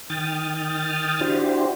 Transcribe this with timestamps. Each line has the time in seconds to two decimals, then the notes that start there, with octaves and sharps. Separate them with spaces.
0.10 D#3 G5 D#6 F6 A6
1.21 D4 E4 F#4 G4 C5